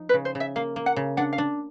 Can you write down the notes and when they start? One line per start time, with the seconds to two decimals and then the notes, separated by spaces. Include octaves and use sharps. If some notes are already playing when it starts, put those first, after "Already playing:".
Already playing: F3 D#4
0.09 B4
0.14 C#3
0.25 C5
0.35 C#3
0.40 E5
0.56 A#3 F5
0.76 A#3
0.86 F#5
0.96 C#3
1.17 D4 F#5
1.33 F5
1.38 D4